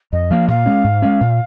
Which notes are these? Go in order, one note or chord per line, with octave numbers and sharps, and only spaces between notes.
F2 D#5
F3 A#3 F5
A#2 F5
G#3 C#4
G#2
G#3 C#4
A#2